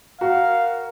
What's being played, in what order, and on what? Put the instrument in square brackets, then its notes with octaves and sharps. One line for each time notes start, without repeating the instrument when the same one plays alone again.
[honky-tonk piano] F#4 [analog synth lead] A#4 [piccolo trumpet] F5